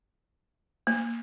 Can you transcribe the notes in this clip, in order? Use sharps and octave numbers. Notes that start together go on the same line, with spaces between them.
A#3